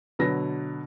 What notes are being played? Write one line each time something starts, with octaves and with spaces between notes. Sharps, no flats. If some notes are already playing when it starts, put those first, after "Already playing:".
B2 D3 F#3 B4 A#6